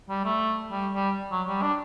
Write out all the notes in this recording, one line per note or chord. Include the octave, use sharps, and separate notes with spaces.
G3
A3
G3
G3
F#3
G3
D4